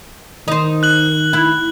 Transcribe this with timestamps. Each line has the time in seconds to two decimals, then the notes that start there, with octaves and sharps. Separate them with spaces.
0.48 D#3 D#4 C5
0.83 F#6 F#7
1.33 E4